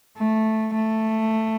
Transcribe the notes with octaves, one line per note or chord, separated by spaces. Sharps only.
A3
A3